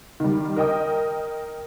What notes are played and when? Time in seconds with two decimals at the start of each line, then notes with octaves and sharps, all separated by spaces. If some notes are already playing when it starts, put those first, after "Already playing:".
0.20 D#3 G3
0.56 A#4 D#5 G5 D#6